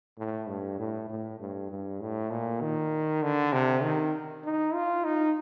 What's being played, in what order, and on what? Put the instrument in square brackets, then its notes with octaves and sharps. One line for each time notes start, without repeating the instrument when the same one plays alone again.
[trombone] A2
G2
A2
A2
G2
G2
A2
A#2
D#3
D3
C3
D#3
D#4
F4
D#4